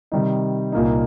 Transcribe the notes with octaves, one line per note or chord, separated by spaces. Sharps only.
C3 D#3 G3 D#4
C2 A#2 A#3 D#4